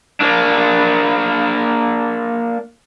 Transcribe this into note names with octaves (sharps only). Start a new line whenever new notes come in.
A#3 D4